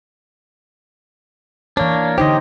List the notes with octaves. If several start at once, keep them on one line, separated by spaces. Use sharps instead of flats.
E3 A#3 D4 C#5
D3 D#4 G4 C5 D#5